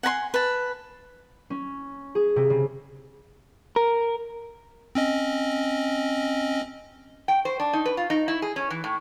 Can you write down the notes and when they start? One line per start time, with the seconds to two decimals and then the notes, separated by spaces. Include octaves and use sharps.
0.03 F#5 G#5 A#5 C6
0.34 B4 A5
1.50 C#4
2.15 G#4
2.36 C3
2.50 C#3
3.76 A#4
4.95 C4 C#4 D#5
7.28 G5
7.45 C5
7.60 D4
7.73 D#4
7.86 B4
7.97 F4
8.10 D#4
8.28 E4
8.42 G#4
8.56 C#4
8.70 E3
8.84 A2